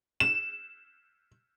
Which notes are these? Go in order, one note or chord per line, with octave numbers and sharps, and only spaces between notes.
E7